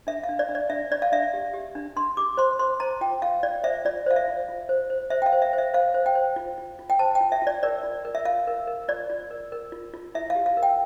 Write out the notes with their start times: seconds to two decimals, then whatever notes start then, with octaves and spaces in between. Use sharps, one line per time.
0.07 D4 E5
0.24 F5
0.29 D4
0.39 D5
0.49 D4
0.55 D5
0.70 D4 E5
0.91 D4 D5
1.02 F5
1.12 D4 E5
1.33 G4
1.54 G4
1.75 D4
1.96 D4 C6
2.17 G4 D6
2.37 C5 C6
2.59 C5 C6
2.80 C5 A#5
3.01 F4 G5
3.22 F4 F5
3.43 F4 D5
3.63 C5 E5
3.85 F4 D5
4.06 C5 F5
4.16 E5
4.28 F4
4.49 F4
4.69 C5
4.90 C5
5.10 C5 E5
5.22 G5
5.26 F5
5.33 C5
5.42 E5
5.53 C5
5.58 E5
5.74 C5 F5
5.94 C5
6.06 G5
6.15 C5
6.36 F4
6.58 F4
6.79 F4
6.90 G5
6.99 C5 A5
7.15 G5
7.21 F4
7.32 E5
7.42 F4 D5
7.63 A#4 D5
7.83 F4
8.05 A#4
8.15 E5
8.25 F4 F5
8.47 A#4
8.67 A#4
8.88 F4 D5
9.10 F4
9.31 A#4
9.52 A#4
9.72 F4
9.94 F4
10.14 E4 E5
10.30 F5
10.35 G4
10.46 F5
10.57 A#4
10.63 G5